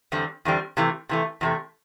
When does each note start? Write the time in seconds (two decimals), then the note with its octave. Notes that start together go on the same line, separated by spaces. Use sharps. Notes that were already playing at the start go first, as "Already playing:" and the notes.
0.12 E2 D3 G3 C4
0.45 E2 D3 G3 C4
0.77 C3 E3 A3
1.09 C3 E3 A3
1.41 E2 C3 A3